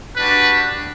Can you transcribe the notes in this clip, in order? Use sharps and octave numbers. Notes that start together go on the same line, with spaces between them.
G3 D4 F#4 B4